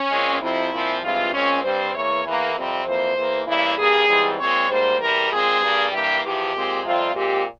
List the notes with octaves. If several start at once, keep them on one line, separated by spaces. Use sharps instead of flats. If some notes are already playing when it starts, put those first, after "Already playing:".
Already playing: C#4
A#2 G#3 C4
F2 C3 F3 C4 E4
A#2 F3 C4
G2 E3 G#3 C4 F4
A#2 G#3 C4 C#4
G2 G3 C4 C5
E2 E3 A#3 C#5
E2 E3 A#3
F2 C3 G3 C4
F2 E3 A#3 C5
E2 E3 A#3
E2 C#3 G3 A#3 E4
G2 G3 A#3 G#4
G#2 E3 G3 C4
A#2 G#3 C4 C#5
G#2 G3 A#3 C5
E2 C3 G3 A#4
A#2 G#3 C4 G#4
G2 G3 A#3
G2 E3 A#3 G4
E2 C3 F3 G4
A#2 G#3 C4
F2 C3 G3 C4 F4
A#2 G#3 C4 G4